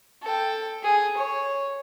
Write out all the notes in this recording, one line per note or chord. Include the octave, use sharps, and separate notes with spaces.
A4 G5
G#4
C#5